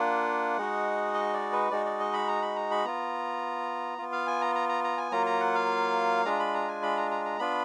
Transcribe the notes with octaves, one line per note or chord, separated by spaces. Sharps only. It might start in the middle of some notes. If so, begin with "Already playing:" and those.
Already playing: A#3 D4 F4 F#5
G#3 D#4 F#4
D#5
D5
B4
G#3 D#4 F#4 D5
D5
D#5
B5
A#5
B5
A#5
B5
B3 F4 A#5
B3 F4
F5
G#5
A#5
A#5
A#5
A#5
G#5
F#3 A#3 F4 A#5
A#5
F#5
F5
G#3 D4 F4 A#5
B5
A#5
G#5
B5
A#5
A#5
A#5
B3 D4 F4 B5